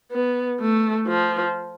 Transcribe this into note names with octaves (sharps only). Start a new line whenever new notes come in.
B3
A3
F3